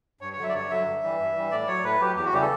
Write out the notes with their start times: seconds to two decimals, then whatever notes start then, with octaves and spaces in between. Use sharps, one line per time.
0.21 G2 C#5
0.33 C#5
0.38 D3 F#3 E5
0.49 D5
0.54 G2 C#5
0.70 D3 F#3 E5
0.87 G2
1.03 E3 G3
1.19 G2
1.35 E3 G3
1.51 A2 D5
1.67 F#3 C#5
1.84 A2 B4
2.01 F#3 G4
2.16 E2 G4
2.25 F#4
2.33 C#3 E3 G3 G4
2.41 A4